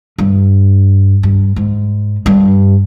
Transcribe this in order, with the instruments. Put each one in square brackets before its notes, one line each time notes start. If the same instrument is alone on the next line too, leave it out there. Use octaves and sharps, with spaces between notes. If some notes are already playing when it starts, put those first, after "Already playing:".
[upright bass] G2
G2
G#2
G2